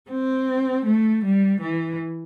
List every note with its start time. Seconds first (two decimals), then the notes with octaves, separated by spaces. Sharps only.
0.11 C4
0.87 A3
1.24 G3
1.62 E3